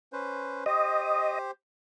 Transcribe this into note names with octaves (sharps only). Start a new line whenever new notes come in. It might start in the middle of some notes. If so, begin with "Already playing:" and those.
C#4 B4 C5
G4 C5 D#5